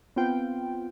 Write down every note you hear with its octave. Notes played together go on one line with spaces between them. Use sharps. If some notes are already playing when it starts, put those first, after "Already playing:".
B3 C4 F4 G5